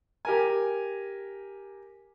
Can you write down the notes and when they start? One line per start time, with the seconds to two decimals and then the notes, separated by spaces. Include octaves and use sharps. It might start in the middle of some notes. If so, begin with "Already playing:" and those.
0.25 G4 A#4 G#5